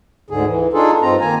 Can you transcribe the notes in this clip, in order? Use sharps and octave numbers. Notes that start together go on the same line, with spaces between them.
D2 G#2 D3 G#4
E3
D4 D#4 F4 G#4 A4
G2 C4 D#4 F4 A#5
D#3 A#3 G#5 A#5